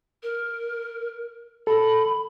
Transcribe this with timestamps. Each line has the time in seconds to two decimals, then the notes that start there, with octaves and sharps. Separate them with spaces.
0.23 A#4
1.67 A4 B5